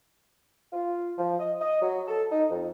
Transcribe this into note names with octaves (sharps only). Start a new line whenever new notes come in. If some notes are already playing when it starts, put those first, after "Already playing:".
F4
F3
D#5
D#5
F#3
A4
D#4
F2